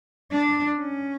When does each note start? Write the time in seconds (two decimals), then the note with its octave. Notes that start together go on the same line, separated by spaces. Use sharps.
0.31 D4
0.78 C#4